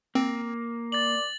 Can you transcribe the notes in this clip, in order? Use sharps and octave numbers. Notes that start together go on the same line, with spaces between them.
A#3 C4
D5 A6 F#7